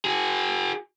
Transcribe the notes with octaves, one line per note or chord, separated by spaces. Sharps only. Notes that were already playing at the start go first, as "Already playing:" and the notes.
F#4 G#4